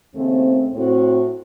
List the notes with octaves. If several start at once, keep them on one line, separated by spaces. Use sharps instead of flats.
D#2 C#3 A3 C4
A2 A3 C4 F#4